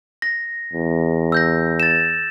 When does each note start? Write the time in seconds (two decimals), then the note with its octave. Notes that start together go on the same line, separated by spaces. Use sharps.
0.22 A#6
0.73 E2
1.32 E6 G6 A#6
1.80 A6 E7